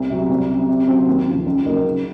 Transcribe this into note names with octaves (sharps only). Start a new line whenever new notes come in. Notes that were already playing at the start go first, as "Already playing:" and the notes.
Already playing: C2
C3 F#3
C2
C3 F#3
C3
F#3 C4
D#2
C#3 F3
C#2
C#3 F#3 A#3 D#4
C#3